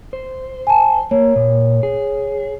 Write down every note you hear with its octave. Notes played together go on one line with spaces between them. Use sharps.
C5
G#5 A5
A#3 C#5
A#2
G#4